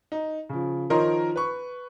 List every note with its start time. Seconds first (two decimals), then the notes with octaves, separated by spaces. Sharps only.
0.12 D#4
0.49 C#3 F3
0.90 D#3 F3 A#4 C#5 D#5 C6
1.36 B4 C#6